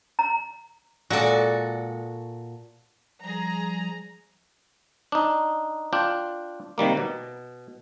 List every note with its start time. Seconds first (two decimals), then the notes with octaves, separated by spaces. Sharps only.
0.19 A#5
1.10 A#2 G#3 F#4 A4 D5
3.23 F3 G3 G#4 A#5
5.12 D4 D#4
5.93 D4 F4 G5
6.78 C3 D#3 G3 A#3
6.97 B2